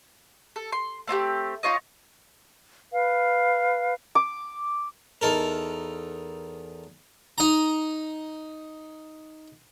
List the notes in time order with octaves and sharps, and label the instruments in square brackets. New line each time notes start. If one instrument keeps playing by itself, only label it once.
[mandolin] A4
C6
A3 C4 F4 G4
D#4 F4 C#5 D#5
[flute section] B4 F5
[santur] D6
[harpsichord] E2 D#4 A4 A#4
D#4 A#5